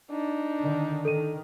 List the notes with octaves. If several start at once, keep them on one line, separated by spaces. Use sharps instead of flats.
D4 D#4
D3 D#3
D#3 A4 D#7